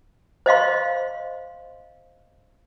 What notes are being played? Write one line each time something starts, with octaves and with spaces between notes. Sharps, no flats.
C5 D#5 F5 C6